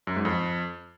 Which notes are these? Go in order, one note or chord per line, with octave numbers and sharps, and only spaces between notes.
F#2
G#2
F2